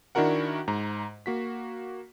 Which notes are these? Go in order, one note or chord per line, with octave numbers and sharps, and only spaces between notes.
D#3 D4 E4 F#4 A#4 F#5
G#2 A#5
A#3 F#4 B6